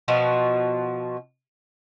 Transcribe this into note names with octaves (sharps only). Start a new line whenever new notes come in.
B2 F3 F#4